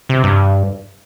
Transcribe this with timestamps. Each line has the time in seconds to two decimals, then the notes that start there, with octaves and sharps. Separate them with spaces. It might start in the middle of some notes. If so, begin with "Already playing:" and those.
0.09 C3
0.23 G2